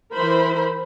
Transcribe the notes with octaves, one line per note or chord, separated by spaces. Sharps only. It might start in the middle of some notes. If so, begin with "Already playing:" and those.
E3 A#4 C5 B5